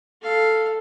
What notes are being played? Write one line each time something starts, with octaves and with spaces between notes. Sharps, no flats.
A4 F5